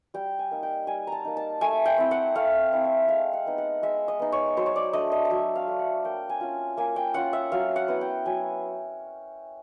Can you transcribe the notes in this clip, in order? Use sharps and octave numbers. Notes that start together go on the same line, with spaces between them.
G3 G5
G#5
A#3 D#4
G5
G3 G#5
A5 A#5
A#3 D#4
A5
A3 G#5
G5
C4 E4
F#5
A3 F5
C4 E4
E5
G#3 F5
F#5
B3 D#4
F#5
G#3 E5
D#5
B3 D#4
C#5
F#3 C5
C#5
D5
A3 D4 D#5
D#5
D#5
F#3 E5
F5
A3 D4
F#5
A#3 G5
G#5
C#4 F4
A#3 G#5
G5
C#4 F4 F#5
E5
F#3 F5
F#5
B3 E4
G5
F#3 G#5